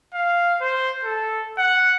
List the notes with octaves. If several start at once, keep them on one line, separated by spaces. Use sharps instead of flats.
F5
C5
A4
F#5